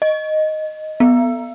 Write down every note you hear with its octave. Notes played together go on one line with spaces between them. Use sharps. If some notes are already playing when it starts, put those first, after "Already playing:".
D#5
B3